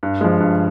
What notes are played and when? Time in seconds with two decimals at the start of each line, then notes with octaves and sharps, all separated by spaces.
0.03 G2
0.21 F3 G#3
0.40 G2